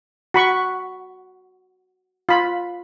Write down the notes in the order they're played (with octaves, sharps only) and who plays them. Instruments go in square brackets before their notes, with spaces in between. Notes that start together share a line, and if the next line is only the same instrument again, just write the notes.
[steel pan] F#4 B5 C#6
F4 B5